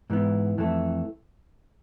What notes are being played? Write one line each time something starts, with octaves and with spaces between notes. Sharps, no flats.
G#2 E3 B3
F2 E3 A3